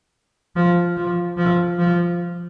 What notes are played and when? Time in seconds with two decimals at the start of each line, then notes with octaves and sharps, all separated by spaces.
0.56 F3
0.97 F3
1.37 F3
1.79 F3